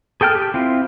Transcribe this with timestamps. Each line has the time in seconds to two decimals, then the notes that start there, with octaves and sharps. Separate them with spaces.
0.21 G#4 A4 G5 A5 F6
0.35 G4
0.54 C4 E4 F4